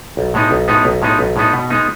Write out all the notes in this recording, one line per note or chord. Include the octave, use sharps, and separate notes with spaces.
B1
A2 G#3 B3 D#4
B1
A2 G#3 B3 D#4
B1
A2 G#3 B3 D#4
B1
A2 G#3 B3 D#4
B2
G#3 B3 D#4